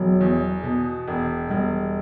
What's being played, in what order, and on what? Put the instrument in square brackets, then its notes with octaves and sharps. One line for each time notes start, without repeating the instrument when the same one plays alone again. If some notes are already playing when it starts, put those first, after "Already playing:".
Already playing: [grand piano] E1 [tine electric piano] F#3
[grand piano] E2
B2
E1
[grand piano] E1 [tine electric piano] G3